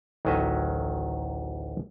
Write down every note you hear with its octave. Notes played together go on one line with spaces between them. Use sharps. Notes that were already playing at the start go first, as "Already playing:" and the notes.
A1 D2 D#3 F#3 D#5 E5